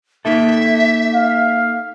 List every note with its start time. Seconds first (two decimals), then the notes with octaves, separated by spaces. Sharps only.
0.25 A#3 D#4 A4 E5
1.15 F5